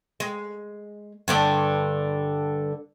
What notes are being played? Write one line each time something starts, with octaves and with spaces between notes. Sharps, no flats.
G#3
G2 D3 D4